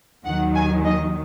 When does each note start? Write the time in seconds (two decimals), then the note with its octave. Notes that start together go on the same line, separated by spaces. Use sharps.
0.26 D#2 D#3 F#3 F#5
0.55 G#5
0.85 D#5